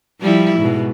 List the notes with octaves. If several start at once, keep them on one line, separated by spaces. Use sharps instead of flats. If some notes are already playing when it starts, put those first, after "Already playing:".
F3 G3 E4
G#2 B2